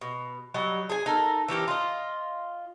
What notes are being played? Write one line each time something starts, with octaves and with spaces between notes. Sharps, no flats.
B2
F#3 G3 D#5
G#4 G#5
D#4 A4 A#4
E3 C#4 G4 A#4
F4 D#5